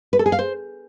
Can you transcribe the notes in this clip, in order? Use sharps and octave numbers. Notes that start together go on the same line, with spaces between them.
B4
A4
G#4
F5
C5